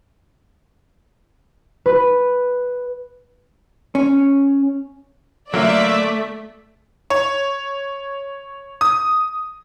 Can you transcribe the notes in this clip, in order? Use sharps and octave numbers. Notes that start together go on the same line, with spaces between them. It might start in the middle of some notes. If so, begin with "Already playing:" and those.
B4
C#4
D3 F#3 A3 A#3 D5 E5
C#5
D#6